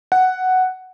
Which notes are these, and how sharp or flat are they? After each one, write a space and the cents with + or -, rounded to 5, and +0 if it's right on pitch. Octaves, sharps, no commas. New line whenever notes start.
F#5 +5